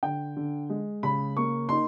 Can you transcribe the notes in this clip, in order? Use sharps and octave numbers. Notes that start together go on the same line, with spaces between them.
D3 G5
D3
G#3
C#3 B5
A#3 C#6
D#4 C6